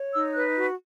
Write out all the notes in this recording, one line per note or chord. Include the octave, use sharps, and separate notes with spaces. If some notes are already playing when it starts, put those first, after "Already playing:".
Already playing: C#5
D#4 E6
B4 F#6
F#4